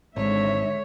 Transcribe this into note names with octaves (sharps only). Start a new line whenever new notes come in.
G#1 D3 G#3 C#5 E5